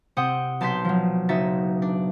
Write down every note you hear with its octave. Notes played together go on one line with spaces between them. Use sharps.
C3 C4 F#5 G5 D#6
B1 A5 C6 G6 B6
F3 F#3
F#1 D#4 F#4 E5 A6
D4